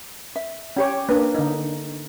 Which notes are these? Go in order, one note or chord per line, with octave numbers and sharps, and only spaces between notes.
E5
C#4 G4 C#5
A#3 D4 A#4 B4
D3 D#4